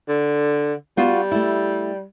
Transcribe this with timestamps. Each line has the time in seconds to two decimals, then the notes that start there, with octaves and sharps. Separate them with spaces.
0.09 D3
0.97 G3 B3 F4 F#4
1.31 A3 E4